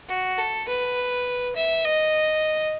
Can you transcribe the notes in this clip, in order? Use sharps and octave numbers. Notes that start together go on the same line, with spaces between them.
F#4
A4
B4
E5
D#5